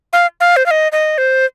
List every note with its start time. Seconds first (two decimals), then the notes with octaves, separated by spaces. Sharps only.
0.13 F5
0.40 F5
0.56 C5
0.66 F5
0.71 D#5
0.92 D#5
1.18 C5